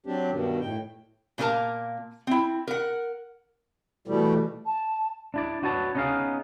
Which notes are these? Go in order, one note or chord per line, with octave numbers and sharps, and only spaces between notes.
F#3 C4 D4 G4
G2 B2 D#3
A2 G5
A#2 E3 A#3 A#4 A5
C4 E4
A#4 F#5
B2 E3 G3 A3
A5
D4 E4 D5
D4 F#4 B4 C#5 A5
B3 C#4 D#4 F#4 G#4 F5